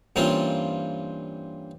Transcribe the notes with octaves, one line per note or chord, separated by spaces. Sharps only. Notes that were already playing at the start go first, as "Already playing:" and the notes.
G2 E3 A#3 C4 C#4 F4